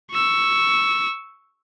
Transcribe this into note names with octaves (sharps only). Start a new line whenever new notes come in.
C#6 E6